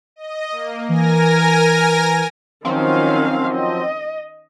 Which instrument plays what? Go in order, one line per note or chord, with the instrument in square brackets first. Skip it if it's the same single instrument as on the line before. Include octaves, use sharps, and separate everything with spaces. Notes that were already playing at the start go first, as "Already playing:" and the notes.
[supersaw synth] D#5
A#3
[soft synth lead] E3 [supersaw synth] A#4 G#5 A#6
[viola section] D#3 C#4 F5 [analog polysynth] F3 F#3 C4
[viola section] D#5